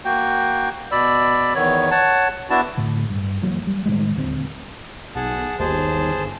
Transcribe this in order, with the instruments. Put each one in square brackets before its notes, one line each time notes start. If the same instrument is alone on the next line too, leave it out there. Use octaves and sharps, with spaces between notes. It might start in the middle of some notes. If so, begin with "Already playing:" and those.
[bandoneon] A#3 F#4 G5
B2 D5 B5 E6
E2 D#3 B3 C#5
C#5 F#5 A5
B3 D4 E4 F#4 A5
[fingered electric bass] A2 D3
G2
F#1 E3 F#3 A#3
G3
A2 D#3 F#3 G#3
D#1 D2 C4
[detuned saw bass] B1 [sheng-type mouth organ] G#4 F#5 A5
[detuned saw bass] G1 [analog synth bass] D#2 [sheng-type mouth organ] G#4 C5 A5